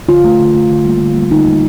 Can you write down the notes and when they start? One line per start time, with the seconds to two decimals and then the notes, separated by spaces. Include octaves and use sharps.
0.08 D3 F4
0.24 A3
0.40 D3
0.55 A3
0.69 D3
0.85 G3 A#3
1.01 D3
1.16 G3 A#3
1.31 D3 D#4
1.46 G3 A#3